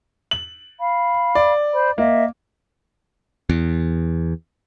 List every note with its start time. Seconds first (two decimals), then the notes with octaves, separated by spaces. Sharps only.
0.31 F#7
0.80 F5 B5
1.35 D5
1.75 C5 B5
1.98 A#3 D#5 E5
3.49 E2